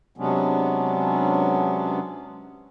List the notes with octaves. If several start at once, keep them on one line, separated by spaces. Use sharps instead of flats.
C3 F#3 G#3 B3 C#4 D4